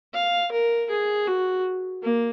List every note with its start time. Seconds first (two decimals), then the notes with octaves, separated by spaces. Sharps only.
0.14 F5
0.52 A#4
0.90 G#4
1.27 F#4
2.02 A#3